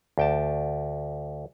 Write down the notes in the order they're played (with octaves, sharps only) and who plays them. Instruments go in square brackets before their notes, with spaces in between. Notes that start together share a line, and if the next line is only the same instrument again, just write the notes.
[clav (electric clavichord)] D2 G5 A5